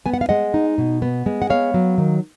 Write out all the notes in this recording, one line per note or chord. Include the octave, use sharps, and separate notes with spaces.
B3 G#5
F#5
F5
G#3 D#5 F#5
D#4
B2
B3
G#3
F#5
B3 C#5 F5
F#3
D#3